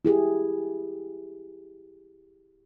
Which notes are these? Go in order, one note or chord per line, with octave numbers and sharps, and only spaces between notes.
E4 G4 G#4